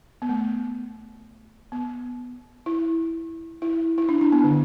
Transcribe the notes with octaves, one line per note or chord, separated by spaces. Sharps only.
B3
A3
B3
E4
E4
E4
D4
D4
B3
D3